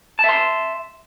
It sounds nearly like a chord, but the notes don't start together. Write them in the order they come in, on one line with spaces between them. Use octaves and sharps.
A5 E5 C6